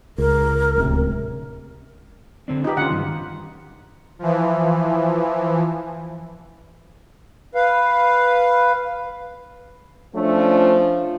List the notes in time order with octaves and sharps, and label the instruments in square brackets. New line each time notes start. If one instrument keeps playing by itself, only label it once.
[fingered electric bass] C#2 [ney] A#4
[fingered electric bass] D1 C#2 C3
[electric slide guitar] D3 C4 D4
[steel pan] D#4 G4 [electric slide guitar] F4 B4
[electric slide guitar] D3 C#4 [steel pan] F4 F#5
[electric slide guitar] G2 D#3
[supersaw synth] E3 F3
[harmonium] B4 F5
[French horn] F3 [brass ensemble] A3 C#4 D4